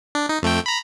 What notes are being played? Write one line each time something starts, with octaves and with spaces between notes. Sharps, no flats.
D4
D#4
F2 A3 G5
A#5 B5